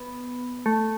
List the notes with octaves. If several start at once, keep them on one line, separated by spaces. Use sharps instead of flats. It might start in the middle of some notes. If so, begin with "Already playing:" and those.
Already playing: B3
A3